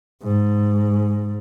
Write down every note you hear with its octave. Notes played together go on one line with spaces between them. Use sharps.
G#2